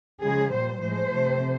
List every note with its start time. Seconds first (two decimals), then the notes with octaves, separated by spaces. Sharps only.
0.21 C#3 F3 G#3 G#4
0.51 A#2 G3 C5
0.81 A2 F3 G#3 C5
1.12 C3 F3 A3